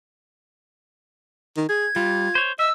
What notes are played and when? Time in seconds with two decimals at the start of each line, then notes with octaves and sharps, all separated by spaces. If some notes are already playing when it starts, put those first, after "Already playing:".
1.57 D#3
1.69 G#4 G#6
1.96 G3 F4
2.35 C5 C#5
2.59 D#5 E5 E6